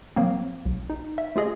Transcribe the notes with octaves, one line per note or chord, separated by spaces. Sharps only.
F3 F#3 A#3 C4
B1
D#4
E5
A3 F4 G#4 D#5